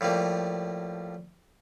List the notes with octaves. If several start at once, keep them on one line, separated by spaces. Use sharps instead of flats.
A2 F3 G3 A#3